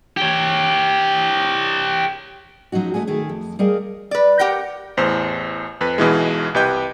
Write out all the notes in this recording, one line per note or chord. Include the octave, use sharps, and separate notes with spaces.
G4 C#5
F3 F#3 C#4 D#4 F#4
G#3 A3 C#4 F#4 G#4
D#3 A3 G#4
F2
G3 G#4 A#4 D#5 F5
B4 D5
G4 A#4 F#5 G5
A1 E2 C5
F2 B4 B5
B1 B2 E3 G#3
C2 G4 B4 D#5 G5 G6